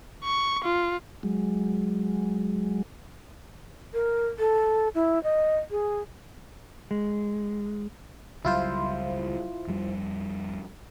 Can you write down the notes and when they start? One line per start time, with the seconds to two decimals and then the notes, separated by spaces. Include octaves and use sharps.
0.24 C#6
0.64 F4
1.23 F#3 G#3
3.94 A#4
4.39 A4
4.95 E4
5.24 D#5
5.71 G#4
6.91 G#3
8.45 C#2 F#3 G3 E4 F4 C5
9.67 F2 G3